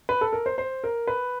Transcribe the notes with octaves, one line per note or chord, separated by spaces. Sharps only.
B4
A4
A#4
C5
C5
A#4
B4